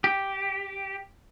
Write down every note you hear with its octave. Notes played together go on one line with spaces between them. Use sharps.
G4